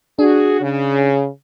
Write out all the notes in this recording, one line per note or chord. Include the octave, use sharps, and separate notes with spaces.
D4 F#4 G#4
C#3